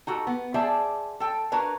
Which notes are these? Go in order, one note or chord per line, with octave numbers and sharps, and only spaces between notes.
D#4 F#4 G4 A4
B3
G#4 C5 D5 E5 A5
A4 G5
D4 F#4 A#4 B4 C#5